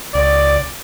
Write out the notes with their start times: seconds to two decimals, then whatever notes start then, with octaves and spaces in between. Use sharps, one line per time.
0.15 C#2 D5